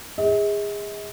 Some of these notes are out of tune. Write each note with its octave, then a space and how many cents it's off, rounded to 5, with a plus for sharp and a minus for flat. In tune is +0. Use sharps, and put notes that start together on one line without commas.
G#4 -25 D#5 +45